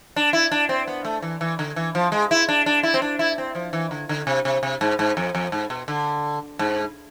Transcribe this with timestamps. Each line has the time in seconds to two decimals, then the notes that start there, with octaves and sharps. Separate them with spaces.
0.16 D4
0.33 E4
0.51 D4
0.69 C4
0.88 B3
1.05 A3
1.22 E3
1.41 E3
1.59 D3
1.76 E3
1.95 F3
2.12 G#3
2.31 E4
2.49 D4
2.66 D4
2.83 E4
2.94 C4
3.02 D4
3.19 E4
3.38 C4
3.55 F3
3.73 E3
3.91 D3
4.09 D3
4.27 C3
4.45 C3
4.63 C3
4.81 G#2
4.99 G#2
5.17 F2
5.35 F2
5.52 G#2
5.70 B2
5.88 D3
6.59 G#2